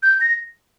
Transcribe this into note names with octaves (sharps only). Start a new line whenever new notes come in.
G6
A#6